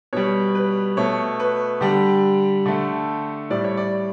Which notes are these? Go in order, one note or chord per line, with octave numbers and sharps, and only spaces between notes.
B2 G3 C#5
B4
B2 A3 C#5
B4
D3 G3 G4
D3 A3
A2 G3 D5
C#5
D5